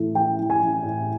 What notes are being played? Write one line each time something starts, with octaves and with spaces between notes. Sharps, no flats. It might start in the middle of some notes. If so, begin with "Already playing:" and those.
Already playing: A2 E3 A3
E3 G5
E3
G#5
E3
A2